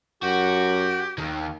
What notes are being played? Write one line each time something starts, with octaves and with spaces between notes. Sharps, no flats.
F#2 F#4 G4
D#2 D#3